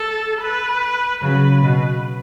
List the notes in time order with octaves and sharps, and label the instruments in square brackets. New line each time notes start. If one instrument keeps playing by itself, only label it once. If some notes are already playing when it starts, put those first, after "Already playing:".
Already playing: [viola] A4
B4
[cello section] C#3 F#3 [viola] B4
[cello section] B2